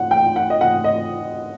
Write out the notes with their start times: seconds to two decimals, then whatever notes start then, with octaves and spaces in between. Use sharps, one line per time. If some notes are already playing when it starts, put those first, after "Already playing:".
Already playing: F#5
0.11 G5
0.36 F#5
0.50 D#5
0.61 F#5
0.84 D#5